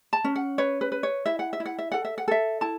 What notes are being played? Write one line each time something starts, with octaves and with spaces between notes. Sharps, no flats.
A5
C#4
F#5
B4 C#5
B4
B4
C#5
E4 E5
F#5
E5
E4
F#5
E5
A4 F#5
E5
F#5
A4 E5
E4 A5